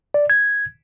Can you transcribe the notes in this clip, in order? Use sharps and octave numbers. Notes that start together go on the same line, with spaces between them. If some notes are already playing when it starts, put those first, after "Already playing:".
D5
G#6